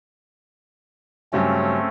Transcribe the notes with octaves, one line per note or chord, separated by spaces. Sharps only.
G2 C#3 F#3 A3 C4 C#4